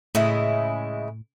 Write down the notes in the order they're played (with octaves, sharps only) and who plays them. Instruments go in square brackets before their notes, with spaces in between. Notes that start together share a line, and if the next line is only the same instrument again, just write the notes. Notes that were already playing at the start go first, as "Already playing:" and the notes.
[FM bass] A2 [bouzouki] C#3 G#3 E4